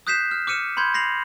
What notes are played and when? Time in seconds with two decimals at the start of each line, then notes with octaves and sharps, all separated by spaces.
0.07 D#6 F#6 G6 B6 C7 E7
0.31 F6
0.47 D6 F6 C#7 D#7 E7
0.77 B5 C6 G6 G#6
0.94 A#6 C7 F7 F#7